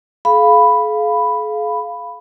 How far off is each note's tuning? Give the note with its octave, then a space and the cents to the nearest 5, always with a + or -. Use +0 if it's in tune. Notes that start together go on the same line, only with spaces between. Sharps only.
G#4 +45 F5 +0 B5 +0